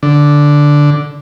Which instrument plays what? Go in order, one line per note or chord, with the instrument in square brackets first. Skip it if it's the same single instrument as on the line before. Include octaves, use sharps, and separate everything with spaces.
[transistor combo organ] D3